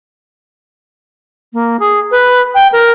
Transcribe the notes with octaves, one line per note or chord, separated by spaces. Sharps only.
A#3
G#4
B4
G5
A#4